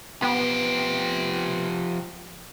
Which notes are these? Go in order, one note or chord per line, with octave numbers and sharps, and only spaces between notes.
F3 B3 G4